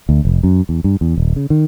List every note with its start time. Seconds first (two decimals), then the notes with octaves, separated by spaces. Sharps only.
0.09 D2
0.25 F1
0.43 F#2
0.69 E2
0.84 G2
1.01 E2
1.17 D#1
1.36 C#3
1.50 D#3